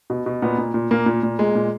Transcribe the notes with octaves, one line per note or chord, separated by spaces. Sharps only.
B2
B2
A#2 B3
A#2
A#2
A#2 A#3
A#2
A#2
A#2 G#3
A#2